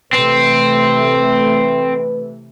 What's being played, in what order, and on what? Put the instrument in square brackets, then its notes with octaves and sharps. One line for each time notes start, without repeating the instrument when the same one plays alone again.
[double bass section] C3 E3 A3 [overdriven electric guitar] C4 [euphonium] B4